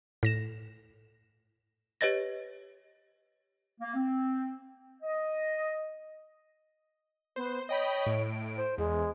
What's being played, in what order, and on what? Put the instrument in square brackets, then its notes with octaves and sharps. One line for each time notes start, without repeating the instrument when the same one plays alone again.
[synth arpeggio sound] A2 A#6 E7
[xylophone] G4 B4 C#5 D#5 A6 A#6
[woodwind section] A#3
C4
D#5
[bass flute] B3 [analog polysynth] C5
[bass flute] C#5 [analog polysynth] D#5 G5 B5
[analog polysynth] A2 D7
[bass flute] C5
[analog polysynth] E2 [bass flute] G#3